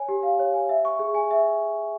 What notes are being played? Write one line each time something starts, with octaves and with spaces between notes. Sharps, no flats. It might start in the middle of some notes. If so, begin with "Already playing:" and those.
Already playing: C#5 G#5
G4
F5
C#5
G#5
E5
C#6
G#4
G#5
E5